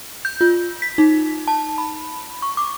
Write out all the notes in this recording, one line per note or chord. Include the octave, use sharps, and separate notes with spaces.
G6
F4
B6
D#4
A5
B5
C#6
D6